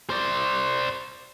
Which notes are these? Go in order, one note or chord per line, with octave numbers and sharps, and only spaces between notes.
C5 D5